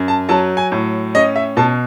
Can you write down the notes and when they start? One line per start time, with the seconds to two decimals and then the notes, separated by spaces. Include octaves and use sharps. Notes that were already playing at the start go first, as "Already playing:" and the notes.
Already playing: F#2
0.08 A5
0.29 F#3 A5
0.57 G#5
0.72 A2
1.15 C#4 D#5
1.36 E5
1.57 B2 A5